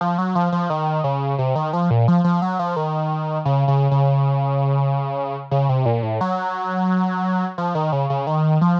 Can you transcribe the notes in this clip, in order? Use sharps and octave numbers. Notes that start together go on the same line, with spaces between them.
F3
F#3
F3
F3
D#3
C#3
C3
D#3
F3
A#2
F3
F3
F#3
F3
D#3
C#3
C#3
C#3
C#3
C3
A#2
A2
F#3
F3
D#3
C#3
C#3
D#3
F3